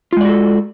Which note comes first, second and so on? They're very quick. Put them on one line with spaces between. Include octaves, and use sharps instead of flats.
F4 G#3 D5 F#4 A4